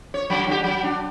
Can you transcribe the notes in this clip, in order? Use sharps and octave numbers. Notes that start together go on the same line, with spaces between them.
C#5
D3 F#3
D3 G4
F#3
D4